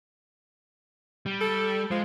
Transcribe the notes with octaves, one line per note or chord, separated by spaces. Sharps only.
G3
A4
F3 G#3